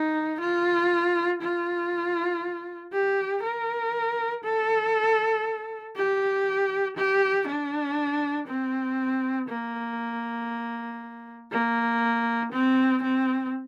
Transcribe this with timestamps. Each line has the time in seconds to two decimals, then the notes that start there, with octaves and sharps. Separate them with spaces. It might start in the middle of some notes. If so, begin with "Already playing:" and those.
Already playing: D#4
0.41 F4
1.42 F4
2.93 G4
3.43 A#4
4.45 A4
5.96 G4
6.97 G4
7.48 D4
8.48 C4
9.49 A#3
11.52 A#3
12.52 C4
13.03 C4